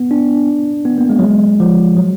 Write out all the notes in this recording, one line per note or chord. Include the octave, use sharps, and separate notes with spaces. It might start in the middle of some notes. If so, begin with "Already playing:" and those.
Already playing: B3
D4
B3
A#3
G#3
F#3
G#3
F3
F#3